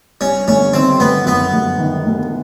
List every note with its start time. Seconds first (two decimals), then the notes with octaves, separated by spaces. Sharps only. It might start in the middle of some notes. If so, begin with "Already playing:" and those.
0.21 G2 C#4
0.48 G1 C#4
0.74 D#3 C4
1.00 G1 B3
1.26 F#2 B3
1.53 G1
1.79 D#3
2.06 G1